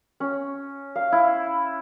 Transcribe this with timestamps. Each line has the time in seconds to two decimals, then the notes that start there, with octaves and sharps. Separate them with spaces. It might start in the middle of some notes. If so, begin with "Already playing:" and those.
0.20 C#4
0.96 F5
1.12 E4